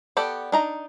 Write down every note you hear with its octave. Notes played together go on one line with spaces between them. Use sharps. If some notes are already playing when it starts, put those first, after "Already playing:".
B3 G4 A4 D5
D4 D#4 A#5